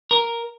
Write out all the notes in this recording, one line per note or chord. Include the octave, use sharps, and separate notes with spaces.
A#4